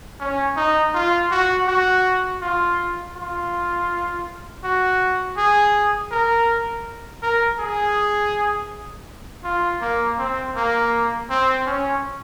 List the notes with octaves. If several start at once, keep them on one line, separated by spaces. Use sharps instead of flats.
C#4
D#4
F4
F#4
F#4
F4
F4
F#4
G#4
A#4
A#4
G#4
F4
A#3
C4
A#3
C4
C#4